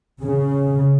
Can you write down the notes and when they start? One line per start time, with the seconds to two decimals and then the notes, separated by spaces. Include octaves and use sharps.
0.22 C#3